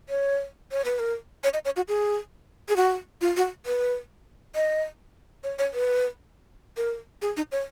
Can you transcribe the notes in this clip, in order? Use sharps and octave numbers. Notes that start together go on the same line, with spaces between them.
C#5
C#5
B4
A#4
C#5
D#5
C#5
F#4
G#4
G#4
F#4
F4
F#4
B4
D#5
C#5
C#5
B4
A#4
G#4
D#4
C#5